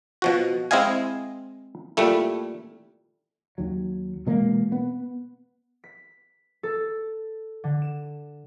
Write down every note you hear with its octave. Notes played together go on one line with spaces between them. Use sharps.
B2 F3 F#4
G#3 C4 E4 D#5 F5 G#5
A#2 G3 A3 E4
D#2 F#3
B2 E3 G#3 A#3
B3
B6
A4
D3
E7